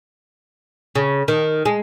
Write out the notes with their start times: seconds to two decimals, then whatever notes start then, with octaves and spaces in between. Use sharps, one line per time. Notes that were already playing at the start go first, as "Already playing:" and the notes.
0.95 C#3
1.28 D#3
1.65 G#3